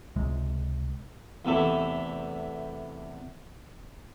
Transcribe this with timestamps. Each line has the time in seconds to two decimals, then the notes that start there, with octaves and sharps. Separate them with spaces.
0.16 C#2 C3 G#3
1.45 E2 C3 A3 E4